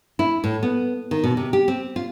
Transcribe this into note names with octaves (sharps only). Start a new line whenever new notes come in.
E4
A2
B3
D#3
B2
C3
G4
C4
F4